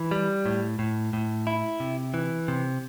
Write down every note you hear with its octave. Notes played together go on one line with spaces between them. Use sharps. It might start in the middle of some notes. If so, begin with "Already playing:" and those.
Already playing: E3
G3
A2
A2
A2
E4
C3
E3
C3